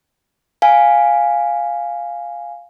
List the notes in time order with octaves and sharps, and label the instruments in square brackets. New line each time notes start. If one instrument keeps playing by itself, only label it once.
[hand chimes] F5 G#5